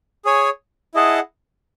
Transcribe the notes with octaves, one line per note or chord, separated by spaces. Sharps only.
G#4 C#5 G#5
E4 G#4 D#5 F#5 A5